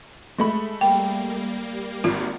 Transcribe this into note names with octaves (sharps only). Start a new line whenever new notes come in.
G#3 A3 B5
G3 A#3 G5
G#1 F4